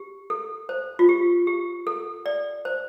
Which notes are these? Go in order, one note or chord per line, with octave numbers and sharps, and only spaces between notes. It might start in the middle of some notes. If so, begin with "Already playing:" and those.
Already playing: G4
A4
C5
F4
G4
G4
A4
D5
C5